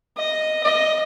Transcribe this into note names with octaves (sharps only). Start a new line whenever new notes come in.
D#5
D#5